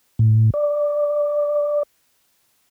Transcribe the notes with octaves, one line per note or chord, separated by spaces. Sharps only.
A2
D5